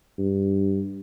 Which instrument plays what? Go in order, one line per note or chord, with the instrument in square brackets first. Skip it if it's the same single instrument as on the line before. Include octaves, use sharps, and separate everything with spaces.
[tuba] G2